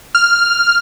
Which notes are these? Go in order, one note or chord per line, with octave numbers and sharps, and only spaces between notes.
F6